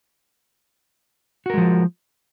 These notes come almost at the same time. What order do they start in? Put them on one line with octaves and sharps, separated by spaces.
F#4 A#4 G#3 F3